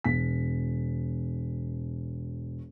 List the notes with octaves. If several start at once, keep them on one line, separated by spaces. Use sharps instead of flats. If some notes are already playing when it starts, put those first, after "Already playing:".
E1 B6